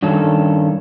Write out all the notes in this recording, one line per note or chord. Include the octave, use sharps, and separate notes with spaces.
G2 D#3 C#4 A4